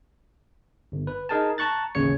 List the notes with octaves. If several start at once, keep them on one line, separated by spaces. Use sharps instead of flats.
G1
B4
D#4 G#4 A#4 G#5 A5
A5 A#5 C#6 F#6 A6
A1 D#2 C#3 C#5 C#7